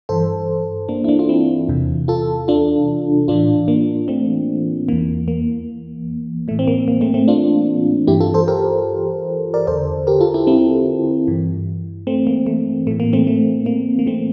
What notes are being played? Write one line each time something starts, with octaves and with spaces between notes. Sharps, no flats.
G2 E3 A4 C5
A#3 D4
E4
A#3 D4
F4
C4 E4
E2 C3 E3
F4 A4
D4 F4
A2 E3 D4 F4
A#3 D4
A3 C4
E2 E3 A#3
A#3
A2 E3 A3
C4
A#3
A#3
A3 C4
A3 C4
D4 F4
G2 E3 E4 G4
F4 A4
A4 C5
G4 A#4
A#4 D5
E2 D3 A4 C5
G4 A#4
F4 A4
E4 G4
C4 E4
G2 E3
A3 C4
A#3
A3
A2 E3 A3
A#3
A3 C4
A3
A#3
A#3
A3 C4